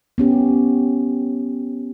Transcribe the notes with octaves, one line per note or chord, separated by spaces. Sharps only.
B3 C#4 G4